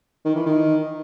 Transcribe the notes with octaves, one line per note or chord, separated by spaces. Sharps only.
D#3
E3
D#3